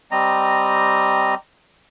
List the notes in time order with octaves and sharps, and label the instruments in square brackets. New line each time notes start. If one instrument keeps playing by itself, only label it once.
[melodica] G3 C4 D#5 A#5